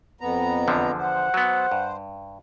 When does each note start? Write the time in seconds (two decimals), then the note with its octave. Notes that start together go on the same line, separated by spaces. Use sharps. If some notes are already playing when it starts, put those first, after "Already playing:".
0.21 F2 B3 A#5
0.68 E2 D3 F3
0.98 C5 F#5
1.34 F#3 B3
1.72 G2